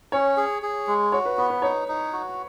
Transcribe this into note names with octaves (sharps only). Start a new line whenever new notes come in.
C#4 C#5
G#4
G#4
G#3
F#4 C#5
B4
B3 B4
B4
D#4 C#5
D#4
F#4